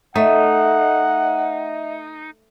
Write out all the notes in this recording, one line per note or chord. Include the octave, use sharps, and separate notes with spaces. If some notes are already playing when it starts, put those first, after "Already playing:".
A3 D#4 D#5 E5 F#5